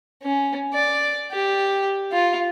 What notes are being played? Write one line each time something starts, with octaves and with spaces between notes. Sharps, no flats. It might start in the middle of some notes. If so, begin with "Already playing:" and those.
C#4
D5
G4
F4